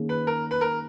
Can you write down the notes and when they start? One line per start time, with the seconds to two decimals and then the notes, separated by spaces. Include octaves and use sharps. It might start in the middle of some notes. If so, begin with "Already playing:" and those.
Already playing: D#3 A#3 C#4 G#4
0.09 B4
0.27 A#4
0.51 B4
0.61 A#4